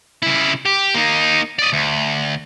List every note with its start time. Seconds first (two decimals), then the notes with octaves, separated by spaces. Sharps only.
0.23 C#3 E4
0.65 G4
0.95 A#3 D#4
1.59 D5 D#5
1.73 D2